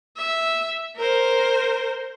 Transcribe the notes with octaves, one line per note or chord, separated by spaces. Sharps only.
E5
A#4 C5